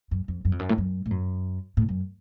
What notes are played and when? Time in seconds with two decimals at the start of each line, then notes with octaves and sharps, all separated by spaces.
0.11 F#2
0.28 F2
0.45 F#2
0.52 F2
0.59 F#2
0.69 A2
0.78 F#2
1.06 A2
1.11 F#2
1.77 A2
1.89 F#2